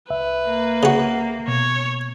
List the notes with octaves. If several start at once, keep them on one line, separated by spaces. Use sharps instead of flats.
C2 B4 E5
A#3
C#3 F#4
B2 C#5